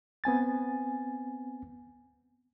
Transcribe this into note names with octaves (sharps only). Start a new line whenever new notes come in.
B3 C4 G#5 A6